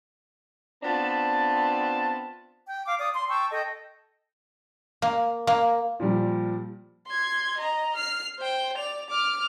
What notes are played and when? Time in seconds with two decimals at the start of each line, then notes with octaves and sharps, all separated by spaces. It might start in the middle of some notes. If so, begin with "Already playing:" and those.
0.83 B3 C4 D4 F4 A5
2.67 G5
2.85 F5 D6
2.99 D5 D#6
3.14 C6
3.28 G5 A5 C#6 E6
3.51 A4 D#5 G5
5.02 A#3
5.47 A#3
6.00 A#2 F3 G3
7.07 C6 G#6
7.58 D#5 A#5
7.96 F6 C7
8.39 C5 G5
8.77 D5 F7
9.10 D6 F6